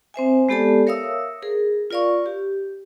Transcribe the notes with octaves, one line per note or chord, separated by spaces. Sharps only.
C4 C5 E5 G#5
G#3 B3 G4 A4 D5 A5
A#4 C#5 E5 F5 D#6 E6
G#4 A#4
F4 A#4 D5 F5 C#6
G4